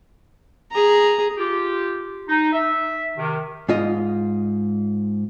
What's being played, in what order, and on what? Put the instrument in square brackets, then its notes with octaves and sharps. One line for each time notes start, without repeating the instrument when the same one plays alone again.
[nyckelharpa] G#4 A#5
[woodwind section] F4 G4
D#4
E5
C3 D#3
[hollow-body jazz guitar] G#2 F4 D#5